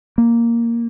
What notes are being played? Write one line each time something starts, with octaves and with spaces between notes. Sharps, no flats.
A#3